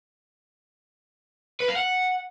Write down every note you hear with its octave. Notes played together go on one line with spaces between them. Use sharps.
B4
F5
F#5